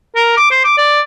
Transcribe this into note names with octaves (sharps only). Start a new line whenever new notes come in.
A#4
D6
C5
D6
D5